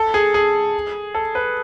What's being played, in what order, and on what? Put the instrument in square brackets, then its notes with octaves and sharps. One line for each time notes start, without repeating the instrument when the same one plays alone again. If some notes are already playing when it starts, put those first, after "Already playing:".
Already playing: [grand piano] A4
G#4
G#4
A4
B4